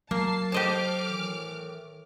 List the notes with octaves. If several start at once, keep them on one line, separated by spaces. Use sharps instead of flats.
F#3 A#3 A5 C7
G4 A4 C5 D#5 A5 D6 F6
A2 D#3 E3